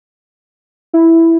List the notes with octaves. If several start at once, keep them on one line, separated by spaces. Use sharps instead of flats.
E4